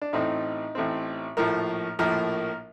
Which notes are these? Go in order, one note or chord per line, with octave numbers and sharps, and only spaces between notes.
D4
A1 A2 A3 C4 D#4
A1 A2 A3 C4
A#1 A2 F3 A#3 A#4
A#1 A2 F3 A#3 A#4